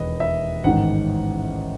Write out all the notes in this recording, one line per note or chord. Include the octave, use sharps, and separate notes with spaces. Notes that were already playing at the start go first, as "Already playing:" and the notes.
Already playing: E1 D#2 B4 D#5
E5
A1 G#2 D#3 F#5